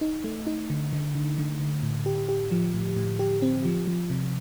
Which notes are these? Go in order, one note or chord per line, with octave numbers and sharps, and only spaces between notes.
D#4
A3
D#4
D3
D3
D3
D3
D3
A2
G4
G4
F3
A2
A2
G4
C4
F3
F3
C3